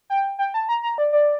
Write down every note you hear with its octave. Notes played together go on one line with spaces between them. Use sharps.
G5
G5
A5
A#5
A#5
D5
D5